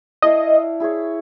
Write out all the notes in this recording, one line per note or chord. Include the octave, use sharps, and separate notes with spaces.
E4 A4 D5 D#5 F5
E4 G#4 C#5